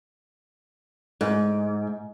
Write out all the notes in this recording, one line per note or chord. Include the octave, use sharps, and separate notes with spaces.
G#2